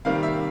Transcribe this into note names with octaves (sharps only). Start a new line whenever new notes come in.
C3 D#3 G3 A#3 F5
E5